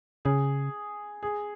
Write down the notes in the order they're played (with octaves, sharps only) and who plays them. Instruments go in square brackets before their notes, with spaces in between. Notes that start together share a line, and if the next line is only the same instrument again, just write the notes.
[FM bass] C#3 [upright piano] G#4
[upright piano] G#4